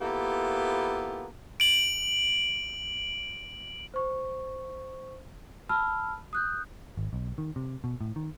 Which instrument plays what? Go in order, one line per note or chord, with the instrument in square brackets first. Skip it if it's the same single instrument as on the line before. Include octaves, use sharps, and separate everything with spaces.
[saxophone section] A#3 B3 E4 F4 G4 A4
[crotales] D7 F#7
[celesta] C5 C#6
A5 B5 E6 F6
D#6 F#6 G6
[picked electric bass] G#1
B1
D#3
C3
B2
A2
D#3